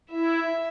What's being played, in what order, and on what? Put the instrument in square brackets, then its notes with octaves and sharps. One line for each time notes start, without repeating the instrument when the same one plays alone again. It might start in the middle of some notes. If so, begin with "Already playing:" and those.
[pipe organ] E4 [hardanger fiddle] E5